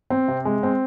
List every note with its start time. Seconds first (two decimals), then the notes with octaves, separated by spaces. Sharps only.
0.10 C4
0.28 C3
0.45 G#3
0.63 C4